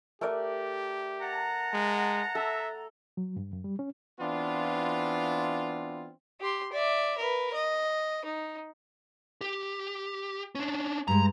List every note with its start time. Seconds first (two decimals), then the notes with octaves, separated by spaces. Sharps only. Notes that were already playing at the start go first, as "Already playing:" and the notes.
0.21 A3 G4 A#4 D5
1.21 F#5 A5 A#5
1.73 G#3
2.35 A4 E5
3.17 F#3
3.36 G2
3.53 F#2
3.64 G3
3.79 C#4
4.20 E3 B3 C4 D4 F4
6.41 G4 C6
6.73 D5 E5
7.19 A#4 B4
7.54 D#5
8.25 D#4
9.41 G4
10.55 C#4 D4
11.08 G2 G#3 A#5